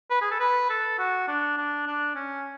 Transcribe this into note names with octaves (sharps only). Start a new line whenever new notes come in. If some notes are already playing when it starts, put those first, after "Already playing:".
B4
G#4
A4
B4
A4
F#4
D4
D4
D4
C#4